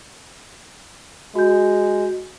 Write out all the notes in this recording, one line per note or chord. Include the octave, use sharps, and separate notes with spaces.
G#3 F#4 G6